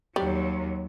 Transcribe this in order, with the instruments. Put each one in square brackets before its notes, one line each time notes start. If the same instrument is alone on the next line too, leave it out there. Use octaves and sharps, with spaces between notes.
[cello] D#2 F#3 [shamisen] G3